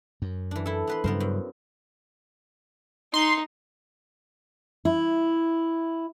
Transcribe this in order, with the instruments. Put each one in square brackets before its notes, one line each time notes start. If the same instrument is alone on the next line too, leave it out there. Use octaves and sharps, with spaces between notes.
[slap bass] F#2
[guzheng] E3 D4
E4 A4
B3 B4 C6
[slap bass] G2 C#3 F#3 [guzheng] B3 A#4 C5
[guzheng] F#2
[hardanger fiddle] D#4 [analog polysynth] C6
[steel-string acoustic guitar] E4